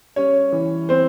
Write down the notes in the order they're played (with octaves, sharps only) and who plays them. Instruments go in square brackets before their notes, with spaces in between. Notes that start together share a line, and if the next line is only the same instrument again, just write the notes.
[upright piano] G3 C#4 C#5
E3
C4 C5